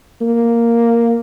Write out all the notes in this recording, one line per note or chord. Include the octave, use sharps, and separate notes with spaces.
A#3